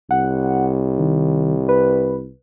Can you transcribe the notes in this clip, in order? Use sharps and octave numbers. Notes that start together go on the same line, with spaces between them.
C2 F#5
D#3
B4